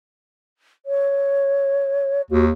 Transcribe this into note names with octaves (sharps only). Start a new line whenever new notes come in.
C#5
D#2 F#4